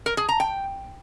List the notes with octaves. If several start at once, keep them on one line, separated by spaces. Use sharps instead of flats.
A#4
G#4
A#5
G5